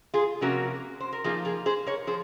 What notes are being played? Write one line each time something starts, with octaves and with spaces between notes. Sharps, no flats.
F4 G#4
C3 F3 A#3 C#4 F#4 A#4
C5
A#4
F3 A#3 D#4 F4 G#4
F4 G#4
G#4 C5
A#4 C#5
F3 G#4 C5